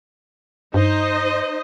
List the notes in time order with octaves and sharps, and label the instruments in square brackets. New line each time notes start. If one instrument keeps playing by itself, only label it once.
[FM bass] G2 [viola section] D#4 C5 D#5